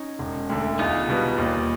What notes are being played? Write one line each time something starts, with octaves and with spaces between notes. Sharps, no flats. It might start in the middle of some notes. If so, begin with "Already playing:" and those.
Already playing: C#4 D#4
E1
D2 D3
E2 D#4 F4
B2 G3 B3
D#2